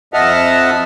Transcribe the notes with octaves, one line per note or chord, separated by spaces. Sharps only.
F2 D#5 E5 F#5 A5 F6